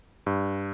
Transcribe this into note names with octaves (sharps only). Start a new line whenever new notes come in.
G2